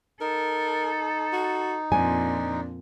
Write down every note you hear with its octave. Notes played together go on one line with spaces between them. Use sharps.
D#4 A4 A#4
F#4
F2 A#2 D4 G#5